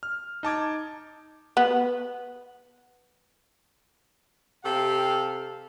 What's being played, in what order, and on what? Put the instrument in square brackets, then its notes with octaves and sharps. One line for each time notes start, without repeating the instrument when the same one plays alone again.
[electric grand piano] F6
D#4 A5 D6 G#6
[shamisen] B3
[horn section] C3 G4 A4 F5